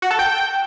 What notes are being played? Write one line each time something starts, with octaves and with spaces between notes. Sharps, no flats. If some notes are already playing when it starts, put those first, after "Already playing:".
F#4
A4
G5